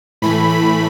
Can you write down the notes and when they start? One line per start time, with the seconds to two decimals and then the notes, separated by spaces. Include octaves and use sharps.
0.22 A2 E3 A3 B5
0.50 B5